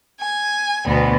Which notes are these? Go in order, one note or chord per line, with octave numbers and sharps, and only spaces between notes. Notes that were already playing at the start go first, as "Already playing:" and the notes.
G#5
D2 B2 B3